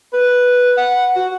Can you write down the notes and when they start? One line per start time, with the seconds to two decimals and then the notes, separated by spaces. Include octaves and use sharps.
0.13 B4
0.77 F#5
1.16 F#4